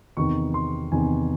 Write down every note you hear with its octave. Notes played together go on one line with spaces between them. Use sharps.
E2 C3 D#3 C#6
C6
E2 C3 D#3 G#5